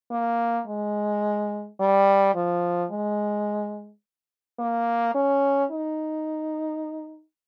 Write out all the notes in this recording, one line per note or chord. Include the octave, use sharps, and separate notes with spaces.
A#3
G#3
G3
F3
G#3
A#3
C#4
D#4